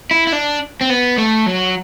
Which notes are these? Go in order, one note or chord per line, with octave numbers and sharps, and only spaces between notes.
E4
E4
D4
C4
B3
A3
F#3